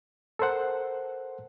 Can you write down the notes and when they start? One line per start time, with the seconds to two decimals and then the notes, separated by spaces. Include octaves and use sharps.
0.39 A4 A#4 C5 F#5